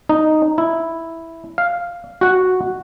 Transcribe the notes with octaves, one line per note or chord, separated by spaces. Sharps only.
D#4
E4
F5
F#4 F#5